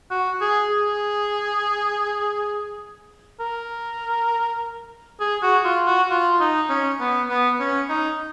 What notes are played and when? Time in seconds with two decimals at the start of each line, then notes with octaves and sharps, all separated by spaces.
0.11 F#4
0.41 G#4
0.70 G#4
3.40 A#4
5.20 G#4
5.43 F#4
5.65 F4
5.87 F#4
6.10 F4
6.40 D#4
6.70 C#4
7.00 B3
7.30 B3
7.60 C#4
7.89 D#4